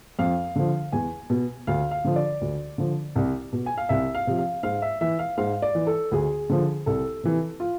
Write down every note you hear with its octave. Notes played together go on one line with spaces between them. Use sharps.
F2 F5
D3 F3
E2 G#5
B2
D2 F5
F5
D3 F3
D5
D2
D3 F3
C2
B2
G#5
F5
C2 E5
F5
C3 F3
F5
G#2 F5
E5
E3 E5
F5
G#2 F5
D5
E3
A4
D2 G#4
D3 F3
C2 A4
C3 E3
F4